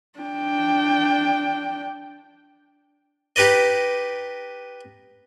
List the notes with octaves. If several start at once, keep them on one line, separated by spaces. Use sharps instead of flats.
D4 G5
D#4 G4 B4 D5 D#5